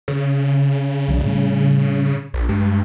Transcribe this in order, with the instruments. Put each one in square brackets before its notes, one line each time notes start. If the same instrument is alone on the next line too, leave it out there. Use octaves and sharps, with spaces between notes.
[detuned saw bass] C#3
[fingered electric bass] B1 D#3 D4
A2 G3
[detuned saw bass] A#1
[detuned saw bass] G2 [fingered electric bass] G#3